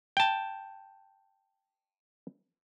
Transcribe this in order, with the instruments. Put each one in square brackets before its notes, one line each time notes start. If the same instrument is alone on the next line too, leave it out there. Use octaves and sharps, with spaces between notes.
[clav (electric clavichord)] G5 A5